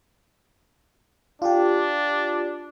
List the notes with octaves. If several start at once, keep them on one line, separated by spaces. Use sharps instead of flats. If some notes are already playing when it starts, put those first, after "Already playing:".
D4 F4 G4